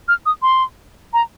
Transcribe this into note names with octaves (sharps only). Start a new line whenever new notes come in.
F6
D#6
C6
A#5